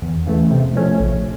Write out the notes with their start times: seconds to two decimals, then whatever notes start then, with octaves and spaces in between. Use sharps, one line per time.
0.02 E2
0.27 C#3 E3 A3
0.51 C3
0.75 F3 A3 C#4
0.99 A#1